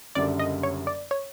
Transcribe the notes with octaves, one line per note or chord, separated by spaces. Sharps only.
F#1 F#2 D3 G3 D5
D#5
C#5
D5
C#5